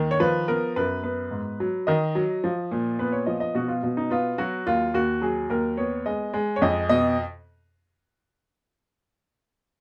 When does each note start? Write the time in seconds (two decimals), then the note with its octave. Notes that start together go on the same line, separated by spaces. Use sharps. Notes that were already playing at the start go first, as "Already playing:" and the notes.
Already playing: D#2 D#3
0.11 C#5
0.20 F3 B4
0.48 B3 A#4
0.76 F#2 B4
1.03 B3 B4
1.31 G#2
1.60 F#3
1.87 D#3 D#5
2.15 F#3
2.44 F3
2.71 A#2
2.99 B3 B4
3.12 C#5
3.26 F3 D#5
3.40 D#5
3.55 B2 F#4
3.68 F4
3.83 B2
3.97 D#4
4.10 B3 F4
4.38 F#3 F#4
4.67 D#2 F4
4.94 D#2 F#4
5.22 F#3 G#4
5.50 D#2 A#4
5.77 B3 C#5
6.06 G#3 D#5
6.34 G#3
6.56 C#5
6.62 F2 D#5
6.89 B2 D#5